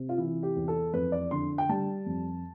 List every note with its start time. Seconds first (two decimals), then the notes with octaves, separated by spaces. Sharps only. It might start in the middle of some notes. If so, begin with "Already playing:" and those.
Already playing: C3
0.09 F4
0.18 E3 E4
0.43 G4
0.56 E2
0.68 A4
0.93 F2 B4
1.12 D5
1.31 D3 C6
1.58 G5
1.69 G3 A5
2.06 F2